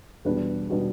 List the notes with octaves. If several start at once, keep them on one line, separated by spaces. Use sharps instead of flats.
E2 B2 G3 D4 B4
B2 G3 D4 B4